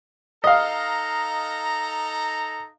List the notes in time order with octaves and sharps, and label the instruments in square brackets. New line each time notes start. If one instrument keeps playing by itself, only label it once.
[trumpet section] D#4 A4 A#5 [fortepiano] D#5 F5